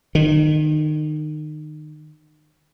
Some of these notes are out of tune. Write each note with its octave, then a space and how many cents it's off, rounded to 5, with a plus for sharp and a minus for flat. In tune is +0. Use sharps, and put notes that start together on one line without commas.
D#3 -30